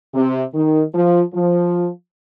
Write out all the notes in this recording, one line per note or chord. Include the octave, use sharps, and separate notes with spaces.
C3
D#3
F3
F3